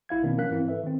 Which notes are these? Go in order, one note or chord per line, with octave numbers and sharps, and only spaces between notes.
A1 E4 F5 G#6
B2 D#3 A#3 C4 D4
F3 C#4 A#4 F5 F#6 B6
G#2 E3 C4 E4
A4 B4 E5
D#3 C4